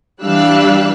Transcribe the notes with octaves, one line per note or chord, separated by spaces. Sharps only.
E3 G3 D4 F5 E6 F#6